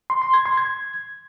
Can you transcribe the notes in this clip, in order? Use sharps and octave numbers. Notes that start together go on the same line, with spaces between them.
C6
C6
G#6
C6
G#6